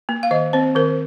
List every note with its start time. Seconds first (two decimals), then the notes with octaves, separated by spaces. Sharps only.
0.09 A#3
0.23 F5
0.31 D#3 D#5
0.53 C4 C5
0.75 D#3 A#4